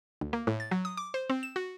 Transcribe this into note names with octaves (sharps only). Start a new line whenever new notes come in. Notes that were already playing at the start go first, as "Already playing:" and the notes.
D2
A#3
A2
A6
F#3
D#6
D6
C5
C4
E7
F#4